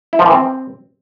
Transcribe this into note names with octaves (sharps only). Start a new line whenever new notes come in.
E4
F3
E3
C4